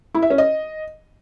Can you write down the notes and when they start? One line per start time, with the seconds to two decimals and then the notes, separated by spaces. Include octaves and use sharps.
0.15 E4
0.22 E5
0.30 C#4
0.38 D#5